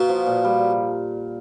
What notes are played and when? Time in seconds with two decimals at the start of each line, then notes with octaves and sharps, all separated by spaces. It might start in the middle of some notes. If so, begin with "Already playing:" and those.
Already playing: B2 A#3
0.09 F3
0.27 A#2
0.44 G3